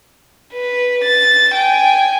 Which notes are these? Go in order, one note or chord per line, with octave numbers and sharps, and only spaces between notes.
B4
A6
G5 G#5